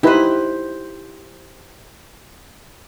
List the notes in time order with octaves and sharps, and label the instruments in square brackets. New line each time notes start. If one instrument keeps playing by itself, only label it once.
[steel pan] D#4 E4 B4 [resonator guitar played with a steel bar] G4 C5